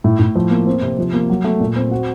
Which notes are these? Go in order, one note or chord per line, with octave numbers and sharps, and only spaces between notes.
A2
A2
F3
A#3
C4
C3
F3
A#3
F#3
A3
A#2
C4
F#4